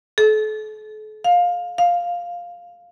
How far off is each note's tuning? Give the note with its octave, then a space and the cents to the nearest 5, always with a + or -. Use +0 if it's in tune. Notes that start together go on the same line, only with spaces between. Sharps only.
A4 -40
F5 +15
F5 +5